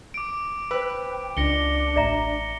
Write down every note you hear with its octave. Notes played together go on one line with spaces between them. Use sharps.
D6 D7
B4 C5 G5 E6
C#2 D4 A#6 C#7 G7
A1 D5 E5 A#5